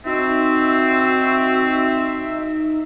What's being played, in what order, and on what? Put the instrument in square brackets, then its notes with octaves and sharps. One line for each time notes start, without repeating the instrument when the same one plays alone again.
[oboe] C4 [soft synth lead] D#4 [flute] F#4 [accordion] E5